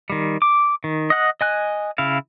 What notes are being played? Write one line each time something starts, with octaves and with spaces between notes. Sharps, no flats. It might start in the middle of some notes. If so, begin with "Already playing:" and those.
D#3 G3
D6
D#3
D#5 F#5 F#6
D#5 G#5 F#6
C#3 E4 F5